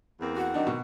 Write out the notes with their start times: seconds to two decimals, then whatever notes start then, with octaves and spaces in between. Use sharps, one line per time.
0.19 E2 A#3 C4
0.36 F#4 F#5
0.54 D#3 F#3 C4 D4 D#4
0.67 B2